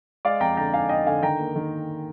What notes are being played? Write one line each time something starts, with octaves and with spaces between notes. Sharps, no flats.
G#3 D5 F5
F2 G5 A#5
D3 G5 A#5
D#4 F5 G#5
D#4 D#5 G5
D3 F5 G#5
D#3 G5 A#5
A#3
D#3